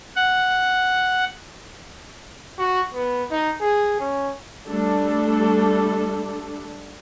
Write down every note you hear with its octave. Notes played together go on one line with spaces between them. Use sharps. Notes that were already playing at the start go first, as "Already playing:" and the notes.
F#5
F#4
B3
D#4
G#4
C#4
G3 A3 D4 A4